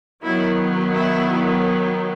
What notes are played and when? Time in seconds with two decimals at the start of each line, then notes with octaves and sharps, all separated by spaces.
0.23 D#3 F#3 B3 E4
0.93 E4